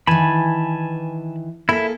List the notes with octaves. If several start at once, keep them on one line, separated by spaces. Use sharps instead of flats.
D#3 E3 G#5 A5 B5
A#3 E4 G#4 A4 E5